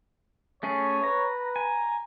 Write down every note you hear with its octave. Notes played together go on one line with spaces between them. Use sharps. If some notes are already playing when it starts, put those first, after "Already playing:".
A3 C#4 G#4 C#5
B4 A#5
G#5 A#5